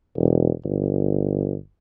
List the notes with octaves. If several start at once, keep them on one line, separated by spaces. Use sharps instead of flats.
E1
G1